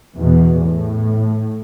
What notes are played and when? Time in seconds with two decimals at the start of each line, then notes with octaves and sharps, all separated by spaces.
0.18 E2 B2
0.61 A2